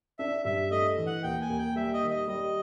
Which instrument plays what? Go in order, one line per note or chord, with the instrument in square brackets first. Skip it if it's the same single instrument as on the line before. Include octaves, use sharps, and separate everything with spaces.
[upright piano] D4 [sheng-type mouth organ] E5
[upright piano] G2 [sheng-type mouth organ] E5
[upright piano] A3 [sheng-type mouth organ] D#5
[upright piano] E3
[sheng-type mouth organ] F#5
[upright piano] D#2 [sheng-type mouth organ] G5
[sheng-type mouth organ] G#5
[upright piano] D#2
[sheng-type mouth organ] G5
[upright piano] G3 [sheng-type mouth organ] E5
[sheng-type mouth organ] D#5
[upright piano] D#3
[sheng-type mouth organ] D#5
[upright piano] G3 [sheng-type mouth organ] D#5